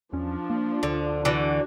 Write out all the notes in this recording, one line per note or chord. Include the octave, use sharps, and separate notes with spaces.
E2 F3 C#4 D4
A#3
D2 D3
D3 E3 D4 F#4